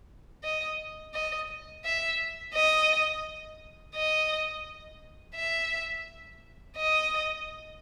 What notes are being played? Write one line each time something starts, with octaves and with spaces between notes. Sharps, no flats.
D#5
D#5
E5
D#5
D#5
E5
D#5